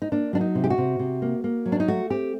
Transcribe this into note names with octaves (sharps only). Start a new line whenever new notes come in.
D#4
A#3 D4
F#3 D4
D#4
C3
G4
F#4
C3
C3
A#3
A#3
F#3
D4
D#4
A3 F#4
C4 G4